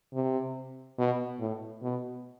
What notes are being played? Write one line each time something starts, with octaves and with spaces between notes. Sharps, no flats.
C3
B2
A2
B2